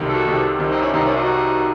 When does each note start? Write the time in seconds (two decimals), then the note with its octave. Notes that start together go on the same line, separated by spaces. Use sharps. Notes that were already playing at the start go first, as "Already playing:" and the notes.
Already playing: C2 C3 D#3
0.08 F#4 A4
0.26 C2 C3 D#3
0.59 C2 C3 D#3
0.71 C4 D#4
0.82 C#4 E4
0.93 C2 C3 D#3 C4 D#4
1.04 C#4 E4
1.16 D#4 F#4